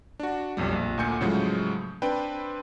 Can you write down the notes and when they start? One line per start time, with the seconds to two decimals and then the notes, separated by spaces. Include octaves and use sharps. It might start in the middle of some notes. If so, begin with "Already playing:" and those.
0.20 D4 F#4
0.57 B1 F2 G3
0.73 A#1
0.98 D2 A#2 A#3 G#5 G6 C#7
1.21 A2 C#3 F3 F#3 G#3
2.02 C4 D4 B4 G5